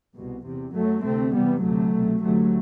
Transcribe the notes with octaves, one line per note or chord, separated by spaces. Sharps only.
C2 B2
E2 C3
F#2 F#3 A3
D2 C3 A3 C4
E2 C3 G3 B3
D2 C3 F#3 A3
C2 B2
D2 C3 F#3 A3